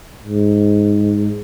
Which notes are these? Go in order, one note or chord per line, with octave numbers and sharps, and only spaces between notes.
G#2